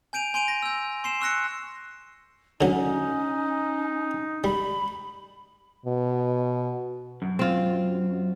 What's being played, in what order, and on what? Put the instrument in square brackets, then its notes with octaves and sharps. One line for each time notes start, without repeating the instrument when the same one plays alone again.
[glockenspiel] G#5 G6 D7 D#7 F7
G#5 C6 G6 D7 D#7 F7
A#6
E6 G6
C6 C7 E7
C#6 E6 F#6 A#6 C#7
[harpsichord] D3 F#3 [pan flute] C#4 [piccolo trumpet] D#4
[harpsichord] G3 [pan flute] B5
[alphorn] B2
[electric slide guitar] F#2
[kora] C4 F4